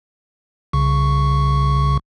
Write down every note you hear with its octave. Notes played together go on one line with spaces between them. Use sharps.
C2 C#3 C#6